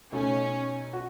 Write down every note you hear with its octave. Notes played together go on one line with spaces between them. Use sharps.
B2 A3 C#4 D#4 A4
F#4